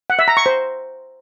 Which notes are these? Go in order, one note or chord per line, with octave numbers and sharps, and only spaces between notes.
F#5
E5
A#5
C#6
C5